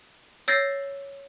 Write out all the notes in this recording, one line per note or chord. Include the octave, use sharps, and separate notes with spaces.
C#5 E6 G6 A6 A#6 C7